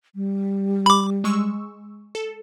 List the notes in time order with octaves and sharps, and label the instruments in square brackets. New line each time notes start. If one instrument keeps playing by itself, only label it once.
[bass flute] G3
[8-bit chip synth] B5 D6
[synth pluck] G#3 C#6 E6
A4